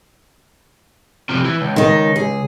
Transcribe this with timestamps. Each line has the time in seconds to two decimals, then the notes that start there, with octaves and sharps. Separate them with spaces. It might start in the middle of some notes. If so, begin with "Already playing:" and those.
1.29 C3 F3
1.45 E3
1.61 C#2
1.76 D#3 D#4
2.16 G#4